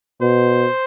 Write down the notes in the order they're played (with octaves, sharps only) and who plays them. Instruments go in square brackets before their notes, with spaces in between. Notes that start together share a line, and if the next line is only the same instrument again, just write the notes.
[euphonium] B2 [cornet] C5